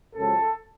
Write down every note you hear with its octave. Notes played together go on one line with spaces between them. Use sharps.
F#2 C#3 F3 G#3 A4